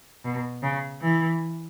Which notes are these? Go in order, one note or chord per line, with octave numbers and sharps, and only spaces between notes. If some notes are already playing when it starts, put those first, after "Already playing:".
B2
C#3
E3